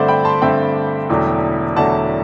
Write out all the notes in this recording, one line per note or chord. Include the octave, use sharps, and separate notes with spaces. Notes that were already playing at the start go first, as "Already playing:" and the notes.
Already playing: G2 D3 A3 C4 C5 D5 E5 F#5
G5 B5
A5 C6
G2 D3 A3 C4 E5 G5
E1 E2 D3 F#3 A3
E1 E2 D3 F#3 A3 F#5 A5